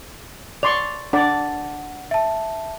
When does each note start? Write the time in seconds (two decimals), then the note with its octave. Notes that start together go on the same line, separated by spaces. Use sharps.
0.63 D5 C6 C#6 F7
1.13 D4 D5 F#5
2.11 E5 A5